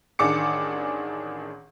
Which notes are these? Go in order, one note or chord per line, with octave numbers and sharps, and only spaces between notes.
A1 D#3 D4 G#4 D6 C#7